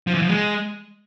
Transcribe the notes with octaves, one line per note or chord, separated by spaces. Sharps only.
F3
E3
F3
G#3